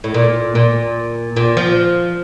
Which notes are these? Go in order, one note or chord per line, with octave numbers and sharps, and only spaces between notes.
A2
A#2
A#2
A#2
F3